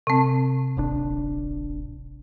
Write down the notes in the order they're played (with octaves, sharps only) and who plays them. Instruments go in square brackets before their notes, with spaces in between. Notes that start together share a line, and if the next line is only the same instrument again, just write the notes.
[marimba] C3 C4
[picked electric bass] D1 G#1 D4